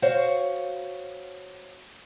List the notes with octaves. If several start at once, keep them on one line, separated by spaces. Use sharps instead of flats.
F#4 C5 C#5 F5